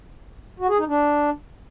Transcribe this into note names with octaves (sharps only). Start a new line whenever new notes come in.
F#4
G#4
D#4
D4